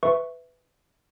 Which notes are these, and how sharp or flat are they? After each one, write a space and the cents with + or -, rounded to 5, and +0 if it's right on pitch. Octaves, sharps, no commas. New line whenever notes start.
B4 +15 E5 +0 C#6 +0